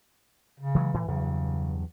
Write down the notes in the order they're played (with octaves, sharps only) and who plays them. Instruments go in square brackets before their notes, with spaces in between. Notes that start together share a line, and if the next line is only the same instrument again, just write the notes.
[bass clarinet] C#3
[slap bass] E3 F#3 G#3
A2 E3
[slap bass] E2 G2 F#3 [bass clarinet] C#3